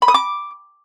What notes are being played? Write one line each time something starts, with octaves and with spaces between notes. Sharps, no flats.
B5
D#6
D6